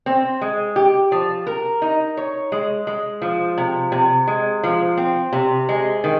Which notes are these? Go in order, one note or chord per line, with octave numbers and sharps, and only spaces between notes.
C4
G#3
G4
F3
A#4
D#4
C#5
G#3
G#3
F3
C3
C3
G#3
F3
C4
C3
G#3
D#3